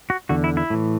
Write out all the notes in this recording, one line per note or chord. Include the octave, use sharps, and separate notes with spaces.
F#4
E2 D3 F#4
E4
E4
A2 E3